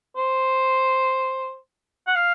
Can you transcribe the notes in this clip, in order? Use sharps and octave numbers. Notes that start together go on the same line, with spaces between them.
C5
F#5
F5